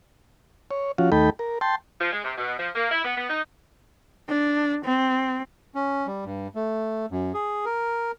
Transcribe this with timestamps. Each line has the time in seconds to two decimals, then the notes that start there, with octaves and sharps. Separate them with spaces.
0.71 C#5
0.98 F3 C#4 F4 F#4
1.12 D#2 A3 D#4 A4 G5 B5
1.39 A#4
1.61 G5 A5 C6
2.01 F3
2.13 G#3
2.24 C3
2.38 B2
2.59 F3
2.76 A#3
2.92 E4
3.05 B3
3.17 B3
3.30 D#4
4.29 D4
4.85 C4
5.75 C#4
6.07 G3
6.25 G2
6.55 A3
7.11 F#2
7.34 G#4
7.65 A#4